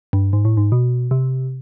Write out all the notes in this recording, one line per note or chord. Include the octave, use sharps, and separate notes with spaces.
G2
G#2
A2
G#2
B2
C3